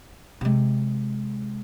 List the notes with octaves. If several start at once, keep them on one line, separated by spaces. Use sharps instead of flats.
C3 G#3